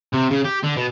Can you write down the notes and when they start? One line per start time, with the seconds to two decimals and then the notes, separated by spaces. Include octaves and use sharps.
0.13 C3
0.31 C#3
0.44 G4
0.63 D3
0.77 B2